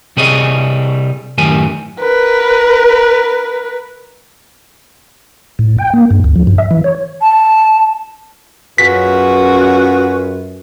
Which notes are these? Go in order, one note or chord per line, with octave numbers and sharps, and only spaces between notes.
C3 G3 G#4 C#5 D#5
F#2 A2 D#3 G4 G#5
A#4 B4
A2
G5
A#3
G2
D2
F3
G2
E5
E3
C#5
A5
F#2 F4 F#4 G#4 B4 B6